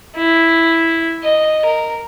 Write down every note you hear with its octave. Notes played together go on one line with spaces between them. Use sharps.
E4
D#5
A#4